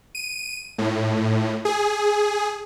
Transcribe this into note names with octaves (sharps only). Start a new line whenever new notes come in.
D#7
A2
G#4